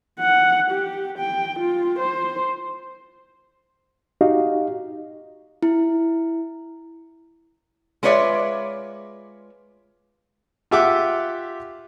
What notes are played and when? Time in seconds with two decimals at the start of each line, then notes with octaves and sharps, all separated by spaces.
0.19 F#5
0.71 G4
1.18 G5
1.59 F4
1.99 C5
4.21 D#4 F#4 G4 D#5 F5
5.62 E4
8.03 G#3 F4 B4 C#5 D5 E5
10.71 F4 G4 E5 F#5 D6